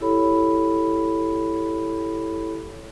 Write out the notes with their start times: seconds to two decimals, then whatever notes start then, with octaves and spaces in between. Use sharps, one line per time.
0.01 E4 G4 A4 C#5 B5